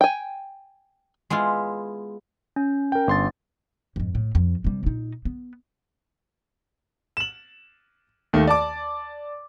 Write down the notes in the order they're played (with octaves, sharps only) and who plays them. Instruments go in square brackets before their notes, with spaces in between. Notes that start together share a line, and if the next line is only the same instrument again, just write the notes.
[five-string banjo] G5 G#5
[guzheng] G#3 B3 E4 F4
[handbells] C#4
[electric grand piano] A#4 G5
G1 C6 A6
[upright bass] F2 G#2
A2
F2
C3 G3
A#2 D#4
B3
[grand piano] E7 F#7
D#2 D#3 A3
D5 A5 D6